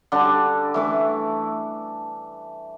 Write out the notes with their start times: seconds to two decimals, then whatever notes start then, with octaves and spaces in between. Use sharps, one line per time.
0.12 D3 G3 D4
0.74 E3 A3 E4